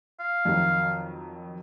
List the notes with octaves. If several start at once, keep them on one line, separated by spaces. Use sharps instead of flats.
F5
F2 D#3 F#3